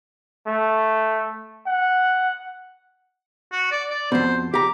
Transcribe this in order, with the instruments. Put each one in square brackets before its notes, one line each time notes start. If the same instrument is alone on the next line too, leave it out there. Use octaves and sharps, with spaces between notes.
[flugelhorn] A3
F#5
[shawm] F#4
D5
D5
[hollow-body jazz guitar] F2 B2 [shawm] C5
[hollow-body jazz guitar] G4 A#5 [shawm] D6